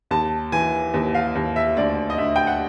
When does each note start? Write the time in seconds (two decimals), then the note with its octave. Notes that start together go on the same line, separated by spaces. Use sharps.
0.11 D#2 A5
0.52 E3 G#5
0.94 D#2
1.15 F5
1.35 D#2
1.56 E5
1.77 D2 D5
2.10 D#5
2.18 D2 E5
2.36 G5
2.47 F#5